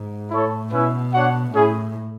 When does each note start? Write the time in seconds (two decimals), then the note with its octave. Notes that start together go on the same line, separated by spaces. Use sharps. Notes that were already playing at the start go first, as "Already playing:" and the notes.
Already playing: G#2
0.30 A2 E4 A4 C#5
0.71 B2 C#4 E4 B4 E5
1.12 D4 F#4 C#5 F#5
1.53 A2 C#4 E4 G#4